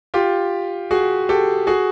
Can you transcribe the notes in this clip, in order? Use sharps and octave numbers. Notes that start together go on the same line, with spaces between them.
F4 G4
F#4 G#4
G4 A4
F#4 G#4